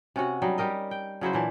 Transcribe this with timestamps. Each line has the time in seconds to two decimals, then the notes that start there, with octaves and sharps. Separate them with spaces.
0.16 C3 C#4 F#4 F#5
0.42 F#3 G3 D#4
0.58 G3 G4 A#4 D#5
0.91 G5
1.21 C#3 F#3 E4 C5
1.33 A#2 E3 D4